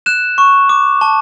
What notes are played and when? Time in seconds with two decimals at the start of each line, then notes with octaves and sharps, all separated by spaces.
0.06 F#6 E7
0.38 C#6
0.69 D6
1.01 A5